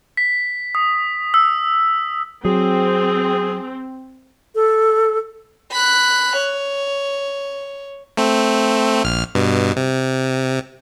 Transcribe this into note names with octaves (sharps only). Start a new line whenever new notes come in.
B6
D#6
E6
F#3 C4 G#4
A4
B5 F#6
C#5
A3 C4
A#1 F6
G2 B2
C3